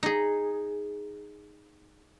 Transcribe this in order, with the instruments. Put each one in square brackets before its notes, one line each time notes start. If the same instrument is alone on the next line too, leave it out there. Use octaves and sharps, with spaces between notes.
[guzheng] D#4 G#4